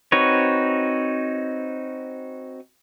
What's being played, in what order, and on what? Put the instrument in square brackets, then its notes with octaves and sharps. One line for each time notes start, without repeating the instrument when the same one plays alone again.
[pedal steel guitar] C4 D#4 F#4 B4 C#5